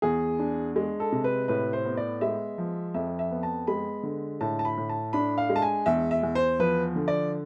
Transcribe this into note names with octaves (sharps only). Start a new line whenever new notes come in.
E2 G#4
D4
G#3
A4
C3
B4
A2 B4
C5
B3
D5
G#3 E5
F3
F2 E5
E5
B3
A5
G#3 B5
D3
A2 A5
A5
B5
A2
A5
D4 B5
F5
G#3
A5
G#5
E2 E5
E5
E2
C5
F3 B4
D3
D5